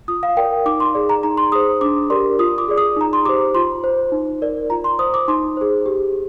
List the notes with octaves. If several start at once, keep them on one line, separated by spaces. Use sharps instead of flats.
F4 D#6
F5
A#4 D5 G5
D#4 D6
C6
G#4 D5
A#5
D#4 A#5
C6
G#4 C5 D#6
D4 D6
G4 A#4 D5 C6
F4 D#6
D6
G#4 D5
D#6
D#4 A#5
C6
G4 C5 D6
F4 C6
C5
D#4
A#4 D5
F4 A#5
C6
C5 D#6
D6
D#4 C6
G#4 C5
G4